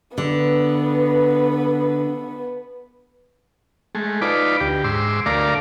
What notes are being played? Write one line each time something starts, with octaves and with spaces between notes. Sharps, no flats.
D3 B3 B4
G#3 A3
D#4 F4 B4 D5 D6
D2 G4
G#2 C6 D6 E6
D2 A3 A#4 D5 F5 D6